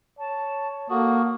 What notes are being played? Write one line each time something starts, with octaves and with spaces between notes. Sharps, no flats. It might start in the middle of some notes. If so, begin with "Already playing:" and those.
C#5 A5
A#3 F#4 A4 D#6